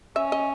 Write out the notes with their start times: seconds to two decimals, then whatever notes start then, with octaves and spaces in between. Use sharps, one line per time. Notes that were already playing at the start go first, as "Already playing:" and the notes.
0.16 C#4 E5
0.32 D#5